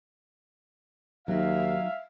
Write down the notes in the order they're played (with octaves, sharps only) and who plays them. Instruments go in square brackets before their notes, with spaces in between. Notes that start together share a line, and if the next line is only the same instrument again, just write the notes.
[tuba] D#2 [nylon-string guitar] F#3 D#4 [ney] E5 [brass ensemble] F5